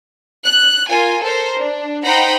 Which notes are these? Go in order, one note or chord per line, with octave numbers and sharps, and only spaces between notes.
F#6
F4 A#4 G#5
A4 A#4 C5
D4
D#4 C5 F#5 G5 A#5 B5